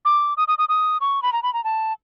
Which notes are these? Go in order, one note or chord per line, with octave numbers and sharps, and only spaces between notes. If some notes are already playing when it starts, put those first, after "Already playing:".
D6
D#6
D#6
D#6
D#6
C#6
B5
A#5
B5
A#5
A5